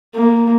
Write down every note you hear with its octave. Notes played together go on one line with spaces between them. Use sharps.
A#3